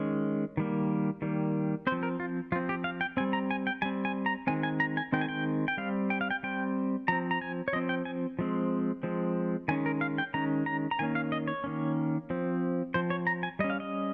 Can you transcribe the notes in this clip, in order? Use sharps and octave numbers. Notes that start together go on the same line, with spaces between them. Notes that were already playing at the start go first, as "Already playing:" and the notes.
Already playing: D#3 G#3 C#4
D#3 G3 A#3
D#3 G3 A#3
C4 C5
F3
A#4
F4
F3 C4 F4
G4
F5
G5
G3 C4 G#5
A#5
G#5
G5
G3 C4 G#5
G#5
A#5
D#3 G#3 C4 G#5
G#5
A#5
G#5
D#3 G#3 C4 G5
G#5
G5
G5
G3 C4 F5
G5
F5
G5
G3 C4 G5
F3 C4 A#5
A#5
G#5
C#5
F3 C4 D#5
G5
G#5
F3 G#3 C4
F3 G#3 C4
D#3 G#3 C#4 G#5
A#4
F5
G5
D#3 G#3 C#4 A#5
A#5
A#5
D#3 A#3 C#4 G#5
F5
D#5
C#5
D#3 A#3 C#4
F3 C4
F3 C4 C5
C#5
A#5
G#5
G3 C#4 D#5
F5
D#5